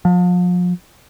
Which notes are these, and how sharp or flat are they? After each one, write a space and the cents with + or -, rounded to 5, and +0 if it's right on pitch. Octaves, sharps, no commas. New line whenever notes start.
F3 +35